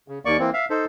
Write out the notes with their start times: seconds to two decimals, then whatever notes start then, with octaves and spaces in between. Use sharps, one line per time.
0.08 C#3
0.25 D#2 A#3 D5 C#6
0.39 E3 A#3 C4
0.53 E5 F5
0.70 D#4 A4 C5